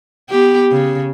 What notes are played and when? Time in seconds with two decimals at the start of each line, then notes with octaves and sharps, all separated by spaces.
0.30 B3 G4
0.72 C#3